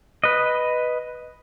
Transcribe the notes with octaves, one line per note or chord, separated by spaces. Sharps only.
B4 D#5